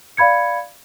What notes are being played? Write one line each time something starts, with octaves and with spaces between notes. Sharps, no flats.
D5 F5 B5 G#6 C#7